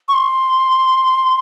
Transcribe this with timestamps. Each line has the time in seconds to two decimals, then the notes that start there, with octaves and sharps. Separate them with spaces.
0.08 C#6
0.13 C6